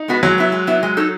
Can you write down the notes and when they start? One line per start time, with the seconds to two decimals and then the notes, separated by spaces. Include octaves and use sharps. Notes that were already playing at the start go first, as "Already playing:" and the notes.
Already playing: D#4
0.08 G#3 B3 F#4 B4
0.23 F#3 G#3
0.38 B3 E4
0.52 G#3
0.67 B3 E4
0.83 G#3
0.97 D#4 A4 C#5